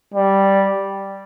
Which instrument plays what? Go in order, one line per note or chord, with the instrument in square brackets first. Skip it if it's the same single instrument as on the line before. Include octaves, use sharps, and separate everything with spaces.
[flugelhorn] G3